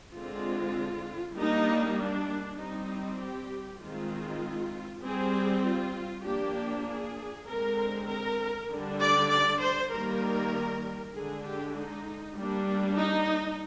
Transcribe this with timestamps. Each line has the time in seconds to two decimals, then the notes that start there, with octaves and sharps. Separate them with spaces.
0.14 D3 G#3 C4 F4
1.35 G3 A#3 D4 D#4
1.97 D4
2.59 G3 C4 D#4
3.19 G4
3.80 D#3 G#3 C4 F4
5.02 G3 C4 G#4
5.64 F4
6.25 F3 A#3 D4 G4
6.86 G#4
7.47 D3 G#3 C4 A#4
8.08 A#4
8.70 D3 G3 D4
9.00 D5
9.30 D5
9.61 C5
9.92 D#3 G3 A#3 A#4
11.14 D3 G#3 D4 G#4
11.45 G4
11.75 D#4
12.37 G3 A#3 D4
12.97 D#4